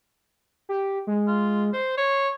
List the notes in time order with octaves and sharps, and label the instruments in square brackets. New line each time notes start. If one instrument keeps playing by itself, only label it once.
[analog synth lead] G4
G#3
[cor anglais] F4
[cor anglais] C5 [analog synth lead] C6
[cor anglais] C#5